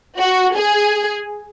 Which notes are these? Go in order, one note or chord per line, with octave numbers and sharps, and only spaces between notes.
F#4
G#4